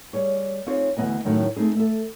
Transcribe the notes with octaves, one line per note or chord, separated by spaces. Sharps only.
G3 G#4 C#5
C4 D#4 F4 G#4 C5 C#5
D2 E3 F#3 B3 D#5 G#5
F#2 A2 D#3 F#3 A3
A3 C4 D#4 G#4
A4 E5